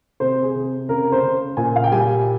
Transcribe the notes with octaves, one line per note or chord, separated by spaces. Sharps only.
C3 C5
G#4
C3
C#3 A#4
C5
C#3
A#2 G#5
F5
G5
G3 G#5